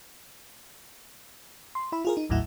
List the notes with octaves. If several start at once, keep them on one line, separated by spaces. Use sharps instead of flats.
C6
E4 E5 B5
F4 G#4 A#4
D#4
A1 D#2 A2 F#3 E4 F#5